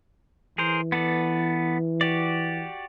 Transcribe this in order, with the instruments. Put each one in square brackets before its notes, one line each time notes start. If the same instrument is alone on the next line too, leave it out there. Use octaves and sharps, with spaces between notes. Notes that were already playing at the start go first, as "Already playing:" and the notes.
[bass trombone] E3 [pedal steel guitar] G#4 A#4 C5
[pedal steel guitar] B3 A4 D5
F#4 G4 D5